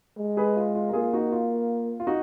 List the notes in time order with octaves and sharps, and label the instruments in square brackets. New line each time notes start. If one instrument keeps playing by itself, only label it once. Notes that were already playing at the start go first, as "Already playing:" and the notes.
[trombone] G#3
[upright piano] G#4 B4
F4
F4
A#4
[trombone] A#3 [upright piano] F4 G#4
[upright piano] D#4 F#4
F4
F4
D#4 F#4